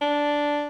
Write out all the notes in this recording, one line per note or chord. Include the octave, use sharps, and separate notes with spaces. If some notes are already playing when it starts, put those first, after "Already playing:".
D4